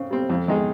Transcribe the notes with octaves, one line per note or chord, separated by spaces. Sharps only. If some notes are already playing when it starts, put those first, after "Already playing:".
Already playing: C#3 C4
G3 C4
F2
D#3 G#3 D#4 G#4